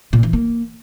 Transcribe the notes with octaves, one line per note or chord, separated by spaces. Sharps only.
A#2
E3
A#3